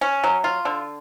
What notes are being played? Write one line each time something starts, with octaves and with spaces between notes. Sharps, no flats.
C#4
F#3
F4
D3